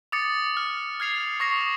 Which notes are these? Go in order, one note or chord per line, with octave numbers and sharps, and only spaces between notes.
D6 D#6 A6 C#7
F6
F6 G#6 C7 F7
C#6 D#6 A#6 C7 F7